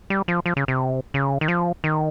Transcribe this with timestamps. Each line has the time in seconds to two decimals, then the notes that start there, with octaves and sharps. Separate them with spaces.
0.10 G3
0.28 F3
0.46 F3
0.57 C#3
0.68 C3
1.14 C#3
1.41 D#3
1.48 F3
1.84 D#3